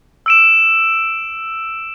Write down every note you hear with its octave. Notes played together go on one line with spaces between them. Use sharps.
E6 D7 E7